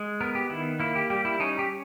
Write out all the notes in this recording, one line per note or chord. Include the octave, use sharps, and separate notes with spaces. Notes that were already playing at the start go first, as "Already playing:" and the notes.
Already playing: G#3
B3 A#4
G4
D#3 E4
A#3 E4
G4
G3 G4
E4
C#4 D#4
G4